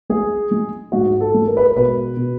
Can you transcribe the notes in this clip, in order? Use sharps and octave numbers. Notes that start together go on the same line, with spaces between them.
G#3 G#4
G#3
G#2 F#4
A4
G#3
A#4
B4
A#4
B2 B4
B2